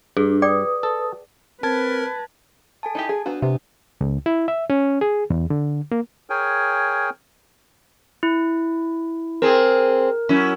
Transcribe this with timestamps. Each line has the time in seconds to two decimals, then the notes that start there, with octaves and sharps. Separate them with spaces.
0.17 G2 D4 G#4
0.42 B4 D5 G5 D6 D#6
0.83 A4
1.63 C4 A#4 B4 A5 G#6
2.83 A4 G#5 A5
2.95 D#4 E4 G4
3.09 G#4
3.26 B3 D4 F#4
3.42 C3 B3
4.01 C#2
4.26 E4
4.48 E5
4.70 C#4
5.01 G#4
5.30 E2
5.50 D3
5.92 A#3
6.30 G#4 A#4 C#5 G5 G#5
8.23 E4
9.42 C4 G#4 A#4
10.29 F#3 C#4 E4